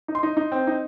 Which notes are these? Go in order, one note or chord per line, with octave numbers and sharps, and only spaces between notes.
D#4
C6
D#4
D#4
C4
D#4